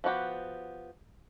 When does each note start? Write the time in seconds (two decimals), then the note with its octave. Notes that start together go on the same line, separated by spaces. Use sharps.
0.04 F3 B3 F#4 G4